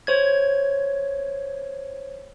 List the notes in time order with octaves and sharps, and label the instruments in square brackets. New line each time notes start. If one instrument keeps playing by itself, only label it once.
[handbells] C5 C#5 G#6